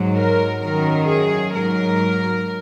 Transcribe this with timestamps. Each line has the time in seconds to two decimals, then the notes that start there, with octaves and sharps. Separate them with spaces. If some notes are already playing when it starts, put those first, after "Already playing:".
Already playing: G#2 F#3
0.16 A#4
0.62 F#2 D#3 F#3 A#4
1.08 G#4
1.54 G#2 F#3 A#4